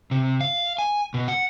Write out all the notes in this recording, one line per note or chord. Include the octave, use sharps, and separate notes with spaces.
C3
F5
G#5
B2
F#5